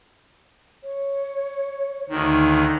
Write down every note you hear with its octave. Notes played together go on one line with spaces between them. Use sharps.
C#5
D2 D#3 D#4